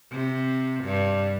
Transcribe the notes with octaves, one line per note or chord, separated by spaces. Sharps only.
C3
G2